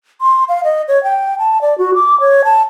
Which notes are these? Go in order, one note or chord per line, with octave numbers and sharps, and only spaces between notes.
C6
F5
D#5
C#5
G5
A5
D5
F#4
D6
C#5
A5